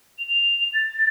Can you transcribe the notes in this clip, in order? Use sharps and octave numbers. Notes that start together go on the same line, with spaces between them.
F7
A6